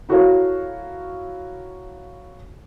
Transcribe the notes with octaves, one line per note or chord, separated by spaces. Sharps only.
E4 F#4 A4 A#4 C#5 F5